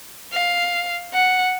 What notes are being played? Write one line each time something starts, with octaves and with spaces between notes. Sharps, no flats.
F5
F#5